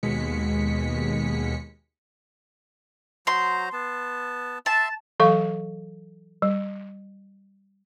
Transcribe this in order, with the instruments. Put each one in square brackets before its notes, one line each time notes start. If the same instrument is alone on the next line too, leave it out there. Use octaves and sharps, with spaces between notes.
[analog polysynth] D#2 B2 G#3 B6 C#7
[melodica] F#3 C5 A#5 [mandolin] C6
[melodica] B3 A5
[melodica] E5 C6 [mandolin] A5
[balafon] E3 F#3 A4 F5 C#6
G3